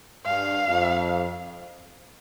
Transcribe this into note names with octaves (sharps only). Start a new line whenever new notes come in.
G2 F5
F2